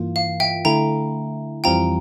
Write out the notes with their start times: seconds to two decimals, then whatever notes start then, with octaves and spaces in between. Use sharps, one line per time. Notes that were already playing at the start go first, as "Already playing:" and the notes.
Already playing: G2 E3 A#3 F4
0.16 F5
0.40 E5 G5
0.65 D3 A3 E4 G5 A#5
1.64 F2 E3 G3 C4 F4 G5 A#5